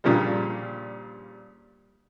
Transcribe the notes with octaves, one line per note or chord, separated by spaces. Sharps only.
G2 A#2 C#3 F3 G3